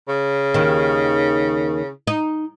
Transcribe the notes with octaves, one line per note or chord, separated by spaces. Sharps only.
C#3
D#2 D#3
D#4